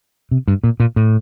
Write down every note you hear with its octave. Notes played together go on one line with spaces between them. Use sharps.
C3
G2
A#2
A#2
A2